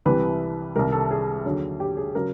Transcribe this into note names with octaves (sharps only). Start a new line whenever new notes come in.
C2 C3 E3 G3 B4
C2 C3 D#3 G3 A#4
A4
G#4
D#2 D3 F#3
G4
G#4
C#3 F#3 A#4